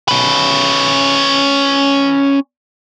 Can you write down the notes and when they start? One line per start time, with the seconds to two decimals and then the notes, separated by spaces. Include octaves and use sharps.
0.08 C#4 B4